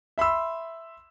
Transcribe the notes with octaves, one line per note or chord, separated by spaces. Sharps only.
E5 B5 C6 E6